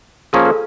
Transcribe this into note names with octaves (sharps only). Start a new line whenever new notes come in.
F3 A#3 C#4 G#4
A4